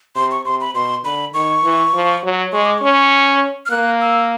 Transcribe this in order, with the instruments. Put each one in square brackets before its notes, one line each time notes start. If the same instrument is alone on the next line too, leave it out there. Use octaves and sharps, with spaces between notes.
[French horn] C3 [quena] C6
[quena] C#6
[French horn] C3 [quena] C6
[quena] B5
[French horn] B2 [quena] C6
[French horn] D3 [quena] B5
[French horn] D#3 [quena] C#6
[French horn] E3
F3
F#3
[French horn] G#3 [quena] C#6
[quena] D6
[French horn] C#4 [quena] C#6
[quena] F6
[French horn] A#3 [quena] F#6
[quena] E6